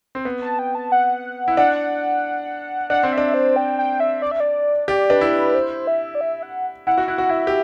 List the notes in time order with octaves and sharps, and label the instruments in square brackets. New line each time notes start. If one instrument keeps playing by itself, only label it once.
[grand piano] C4
B3
[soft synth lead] A5
G5
A5
F#5
[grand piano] E4
[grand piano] D4 [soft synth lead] F#5
[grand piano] D4 [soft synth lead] F#5
[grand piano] C4
[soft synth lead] E5
[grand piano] D4
[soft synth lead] C5
G5
G5
E5
D5
E5
D5
[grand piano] G4 [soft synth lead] D5
[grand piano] D4 [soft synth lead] B4
[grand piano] E4
[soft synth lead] B4
C5
E5
D5
E5
F#5
[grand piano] E4 [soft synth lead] F#5
[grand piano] F#4
[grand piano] E4 [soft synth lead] F#5
[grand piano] F#4
[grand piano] E4 [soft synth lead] E5
[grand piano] G4